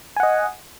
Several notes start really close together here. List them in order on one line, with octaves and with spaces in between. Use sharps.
G#5 F#5 D#5